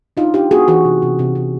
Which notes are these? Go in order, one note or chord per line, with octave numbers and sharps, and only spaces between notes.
D4 D#4 F4
D4 F4 G4
B3 F#4 G#4
E3 F#4 G#4
C3
C3
C3
C3